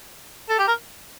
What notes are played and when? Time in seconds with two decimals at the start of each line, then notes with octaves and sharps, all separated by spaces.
0.49 A4
0.59 G4
0.68 A#4